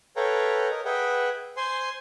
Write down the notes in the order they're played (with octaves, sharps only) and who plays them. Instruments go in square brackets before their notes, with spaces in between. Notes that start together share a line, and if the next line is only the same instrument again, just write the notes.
[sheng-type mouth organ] A4 B4 C#5 F5 G5 A#5
A#4 D#5
G#4 B4 E5 F#5 G5
C5 G#5 C6